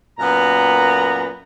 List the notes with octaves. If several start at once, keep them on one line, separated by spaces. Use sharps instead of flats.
F#2 A#2 B3 A#5